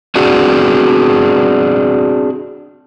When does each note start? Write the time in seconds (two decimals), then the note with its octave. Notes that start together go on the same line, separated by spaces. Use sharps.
0.15 C4 D4 F#4 G#4 F#5